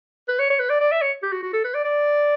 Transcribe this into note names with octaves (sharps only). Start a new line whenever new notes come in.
B4
C#5
C#5
B4
D5
D5
E5
C#5
G4
F#4
F#4
A4
B4
D5
D5